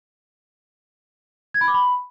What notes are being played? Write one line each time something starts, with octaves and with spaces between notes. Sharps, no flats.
G#6
B5
D6
B5